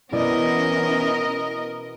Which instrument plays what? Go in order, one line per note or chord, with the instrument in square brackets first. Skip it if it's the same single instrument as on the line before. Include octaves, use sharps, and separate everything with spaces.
[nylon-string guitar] B2 E4 D5 [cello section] E3 B3 C#4 [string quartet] A#4 D#5